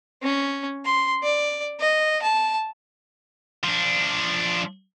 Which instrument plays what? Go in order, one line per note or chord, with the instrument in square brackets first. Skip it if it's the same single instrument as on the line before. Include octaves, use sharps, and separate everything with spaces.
[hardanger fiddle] C#4
C6
D5
D#5
A5
[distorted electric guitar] F3 D4